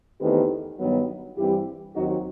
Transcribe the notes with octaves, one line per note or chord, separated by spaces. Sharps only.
E2 D#3 A3 C4 G4 B4
G2 D#3 F#3 B3
G2 E3 G3 C4 E4 G4
D#2 D#3 F#3 C4 D#4 F#4